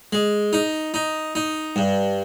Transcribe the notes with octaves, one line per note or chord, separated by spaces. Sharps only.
G#3
D#4
D#4
D#4
G2